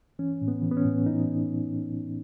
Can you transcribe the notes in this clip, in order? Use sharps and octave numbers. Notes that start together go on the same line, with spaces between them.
E3 C#4
A2
B3
E3
B3
C#4
A2
E3 D#4